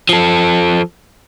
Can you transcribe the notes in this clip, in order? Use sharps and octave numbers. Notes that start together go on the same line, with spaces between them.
F3 A4